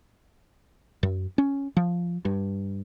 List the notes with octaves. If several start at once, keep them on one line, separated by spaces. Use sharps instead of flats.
F#2
C#4
F3
G2